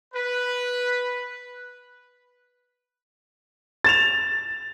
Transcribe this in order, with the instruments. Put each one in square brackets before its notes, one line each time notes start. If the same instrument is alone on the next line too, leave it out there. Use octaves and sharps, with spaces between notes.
[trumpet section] B4
[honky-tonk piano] A6 E7 F7